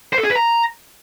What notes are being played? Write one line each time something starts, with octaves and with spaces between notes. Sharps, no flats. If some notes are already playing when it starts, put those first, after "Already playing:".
C5
A4
G#4
B4
A#5